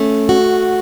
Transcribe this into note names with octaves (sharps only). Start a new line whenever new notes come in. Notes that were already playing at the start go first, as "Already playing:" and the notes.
Already playing: A3 C#4
F#4